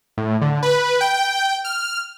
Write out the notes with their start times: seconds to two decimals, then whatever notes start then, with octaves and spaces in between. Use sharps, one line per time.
0.18 A2
0.41 D3
0.63 B4
1.01 G5
1.65 F6